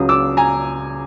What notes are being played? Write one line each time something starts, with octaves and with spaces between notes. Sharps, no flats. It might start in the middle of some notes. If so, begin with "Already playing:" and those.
Already playing: C#2 C#3 F#3 D#6
D6 E6
G#5 A#5